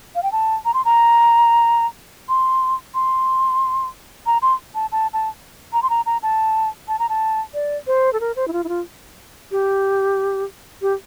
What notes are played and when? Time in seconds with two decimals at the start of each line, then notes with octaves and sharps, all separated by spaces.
0.15 F5
0.23 G5
0.32 A5
0.65 A#5
0.74 C6
0.85 A#5
2.29 C6
2.94 C6
4.26 A#5
4.42 C6
4.75 A5
4.92 A5
5.13 A5
5.73 A#5
5.82 C6
5.90 A#5
6.06 A#5
6.23 A5
6.88 A5
6.99 A#5
7.09 A5
7.54 D5
7.87 C5
8.13 A4
8.20 A#4
8.36 C5
8.48 E4
8.53 F4
8.64 E4
8.68 F4
9.51 G4
10.82 G4